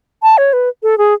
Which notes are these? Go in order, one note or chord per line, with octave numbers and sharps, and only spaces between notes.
A5
C#5
B4
A4
G#4